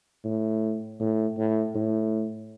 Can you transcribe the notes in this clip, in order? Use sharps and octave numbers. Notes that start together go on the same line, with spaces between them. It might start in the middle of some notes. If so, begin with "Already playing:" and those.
A2
A2
A2
A2